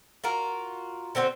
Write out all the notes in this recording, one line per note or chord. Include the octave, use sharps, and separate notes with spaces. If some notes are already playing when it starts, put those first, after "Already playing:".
F4 F#4 A#4
D3 C4 F#4 C5